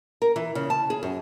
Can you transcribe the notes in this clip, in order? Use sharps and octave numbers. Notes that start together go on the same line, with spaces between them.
A#4
E3
C#3
A5
G#4
F#2